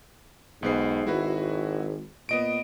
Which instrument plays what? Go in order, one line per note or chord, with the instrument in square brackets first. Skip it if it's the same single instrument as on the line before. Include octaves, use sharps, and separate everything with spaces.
[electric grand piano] B1 B3 C7 [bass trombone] G#2
[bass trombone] G#1 [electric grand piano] E4 F#4 B4
[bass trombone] A#2 [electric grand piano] B3 D#5 D7